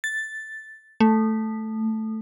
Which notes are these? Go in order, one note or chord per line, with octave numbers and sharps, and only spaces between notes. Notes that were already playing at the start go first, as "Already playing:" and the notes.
A6
A3